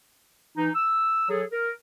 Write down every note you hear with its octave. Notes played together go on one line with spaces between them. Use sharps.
E3 D#4
E6
F#3 G#4 A4
A#4